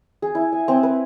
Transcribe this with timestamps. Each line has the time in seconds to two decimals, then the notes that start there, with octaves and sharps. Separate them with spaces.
0.22 G#4
0.35 E4
0.52 G#5
0.68 C4
0.83 B4